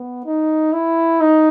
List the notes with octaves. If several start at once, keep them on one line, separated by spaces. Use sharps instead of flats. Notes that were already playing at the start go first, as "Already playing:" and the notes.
Already playing: B3
D#4
E4
D#4